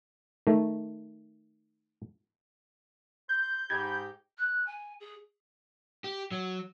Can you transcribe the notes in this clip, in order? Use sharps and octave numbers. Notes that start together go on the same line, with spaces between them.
D#3 A3
C5 G6
G#2 D#4 G4 B5 G#6
F#6
G#5
G#4
G4
F#3